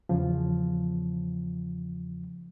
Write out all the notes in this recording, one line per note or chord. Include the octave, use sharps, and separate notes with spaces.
E2 C#3 F3